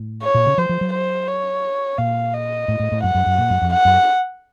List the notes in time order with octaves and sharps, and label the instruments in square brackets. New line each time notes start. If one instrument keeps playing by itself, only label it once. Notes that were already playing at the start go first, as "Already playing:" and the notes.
Already playing: [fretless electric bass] A2
[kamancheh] C#5
[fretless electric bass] A#2
C#3
[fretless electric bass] F3 [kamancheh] C5
[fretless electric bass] F3
F#3
[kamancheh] C5
C#5
[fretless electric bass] A#2 [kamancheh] F5
[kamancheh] D#5
[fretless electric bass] A2
A2
A2
[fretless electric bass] F#2 [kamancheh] F#5
[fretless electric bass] F#2
F#2
A#2
F#2
F2
[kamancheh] F#5
[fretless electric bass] F#2